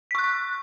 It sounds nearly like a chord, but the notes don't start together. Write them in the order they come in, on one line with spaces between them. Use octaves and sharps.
B6 C#6 F#6